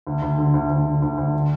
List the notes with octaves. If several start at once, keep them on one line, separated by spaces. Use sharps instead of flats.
D2
D2
D3
D2
D2
D3
D2
D2
D3